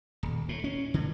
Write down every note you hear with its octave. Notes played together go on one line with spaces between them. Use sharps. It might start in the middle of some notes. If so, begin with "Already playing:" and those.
D#1
A2
C#4
D3